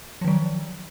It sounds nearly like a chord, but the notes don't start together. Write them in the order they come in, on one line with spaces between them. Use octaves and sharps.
F3 D#3 F#3